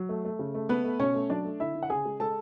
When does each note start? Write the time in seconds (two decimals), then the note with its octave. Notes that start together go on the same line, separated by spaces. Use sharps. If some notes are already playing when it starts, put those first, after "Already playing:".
Already playing: F#3
0.09 A3
0.25 A3
0.39 C#3
0.54 A3
0.69 A3 B3 B4
0.84 A3
0.99 B2 C#4 C#5
1.14 A3
1.30 F#3 D4 D5
1.45 A3
1.60 D3 E4 E5
1.75 D3
1.83 F#5
1.90 C#3 G#4 G#5
2.05 G#3
2.20 G#3 A4 A5